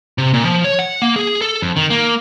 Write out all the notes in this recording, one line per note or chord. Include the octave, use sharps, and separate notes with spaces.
C3
A#2
F3
C#5
F#5
A#3
G#4
A4
F2
D#3
A#3